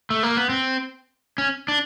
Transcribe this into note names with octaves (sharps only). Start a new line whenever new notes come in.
A3
A#3
B3
C4
C#4
D4